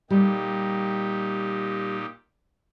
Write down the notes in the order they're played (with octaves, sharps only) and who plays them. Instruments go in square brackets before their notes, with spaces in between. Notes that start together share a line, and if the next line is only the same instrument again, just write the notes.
[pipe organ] A#2 D#4 G4 [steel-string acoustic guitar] G3